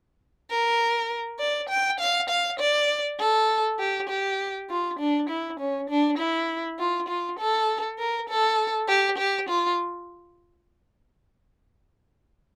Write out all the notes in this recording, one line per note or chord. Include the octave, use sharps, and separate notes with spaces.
A#4
D5
G5
F5
F5
D5
A4
G4
G4
F4
D4
E4
C#4
D4
E4
F4
F4
A4
A#4
A4
G4
G4
F4